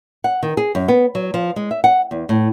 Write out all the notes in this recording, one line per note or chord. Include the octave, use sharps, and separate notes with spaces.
F#5
D#3
G#4
F#2
B3
F#3
F3
G#3
E5
F#5
E2
A2